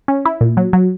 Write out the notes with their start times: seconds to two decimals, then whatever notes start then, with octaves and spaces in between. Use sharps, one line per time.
0.08 C#4
0.25 E4
0.41 A#2
0.57 F#3
0.73 F#3